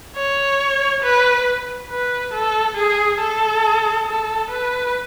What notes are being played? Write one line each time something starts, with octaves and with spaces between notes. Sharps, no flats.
C#5
B4
B4
A4
G#4
A4
A4
B4